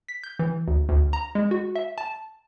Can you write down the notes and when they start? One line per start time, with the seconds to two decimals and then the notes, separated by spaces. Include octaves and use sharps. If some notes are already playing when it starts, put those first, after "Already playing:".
0.09 B6
0.23 G6
0.39 E3
0.68 D2
0.89 D2
1.13 A#5
1.35 G#3
1.51 F#4
1.76 E5
1.98 A5